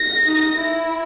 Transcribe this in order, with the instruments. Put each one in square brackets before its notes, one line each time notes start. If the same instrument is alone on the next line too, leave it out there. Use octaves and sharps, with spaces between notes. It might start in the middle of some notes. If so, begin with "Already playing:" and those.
Already playing: [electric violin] A#6
[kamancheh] D#4
E4